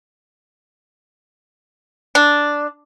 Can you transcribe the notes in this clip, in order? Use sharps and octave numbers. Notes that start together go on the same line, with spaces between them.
D4